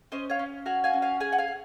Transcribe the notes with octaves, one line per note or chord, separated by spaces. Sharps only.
C#4 C5 D#5
C#5 F5
C#4
F#4 F5 G#5
F5 G#5
C#4
F5 G#5
G#4 F5 G#5
F#5
F5 G#5
G#4